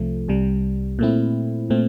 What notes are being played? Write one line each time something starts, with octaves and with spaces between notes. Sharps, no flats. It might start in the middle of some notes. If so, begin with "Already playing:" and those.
Already playing: C2 C3 F3 A3
C2 C3 G3
A#2 A3 C4 E4
A#2 A3 C4